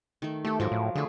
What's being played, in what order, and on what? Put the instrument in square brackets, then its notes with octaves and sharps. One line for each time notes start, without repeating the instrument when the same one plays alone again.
[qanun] D#3 A3
[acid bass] A3 [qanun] G4 A4
[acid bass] G#2 [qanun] F3 F#3 A#4
[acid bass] A2
[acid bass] D3 [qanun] A3 G#4